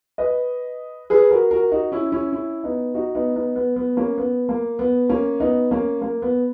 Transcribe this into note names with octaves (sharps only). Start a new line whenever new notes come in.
B4 D#5
G#4 B4
F#4 A#4
F#4 A#4
D#4 F#4
C#4 E4
C#4 E4
C#4 E4
B3 D#4
D#4 F#4
B3 D#4
B3 D#4
B3
B3
A#3 C#4
B3
A#3
B3
A#3 C#4
B3 D#4
A#3 C#4
A#3
B3